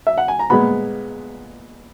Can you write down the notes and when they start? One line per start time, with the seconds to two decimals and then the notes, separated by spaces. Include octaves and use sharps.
0.07 E5
0.18 F#5
0.28 G#5
0.39 A#5
0.50 A#2 G#3 B3 B5